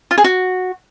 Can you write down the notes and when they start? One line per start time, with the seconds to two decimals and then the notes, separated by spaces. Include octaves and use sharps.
0.11 F4
0.18 G#4
0.24 F#4